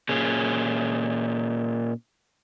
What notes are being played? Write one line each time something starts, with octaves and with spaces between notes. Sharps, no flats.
A#2 C#4 G#4